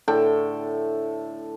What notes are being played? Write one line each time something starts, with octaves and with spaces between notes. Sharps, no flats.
A2 D3 A4 G5